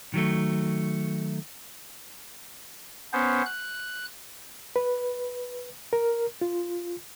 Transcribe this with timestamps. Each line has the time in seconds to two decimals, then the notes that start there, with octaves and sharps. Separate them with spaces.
0.14 D#3 F#3 A3
3.13 B3 C#4 C5
3.46 F#6
4.76 B4
5.93 A#4
6.41 F4